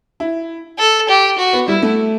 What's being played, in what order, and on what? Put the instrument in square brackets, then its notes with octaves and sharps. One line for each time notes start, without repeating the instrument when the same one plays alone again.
[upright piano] E4
[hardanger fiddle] A4
G4
F#4
[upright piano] B3
[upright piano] G3 [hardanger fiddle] E4
[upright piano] A3